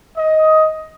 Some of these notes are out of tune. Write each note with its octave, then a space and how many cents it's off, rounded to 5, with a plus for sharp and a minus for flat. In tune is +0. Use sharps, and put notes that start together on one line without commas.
D#5 +10